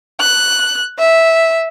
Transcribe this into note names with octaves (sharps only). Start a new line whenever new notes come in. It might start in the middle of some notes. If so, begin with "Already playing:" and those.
F#6
E5